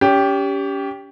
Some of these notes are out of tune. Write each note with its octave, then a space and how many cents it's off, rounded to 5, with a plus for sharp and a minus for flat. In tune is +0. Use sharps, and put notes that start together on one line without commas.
C#4 +35 G4 +0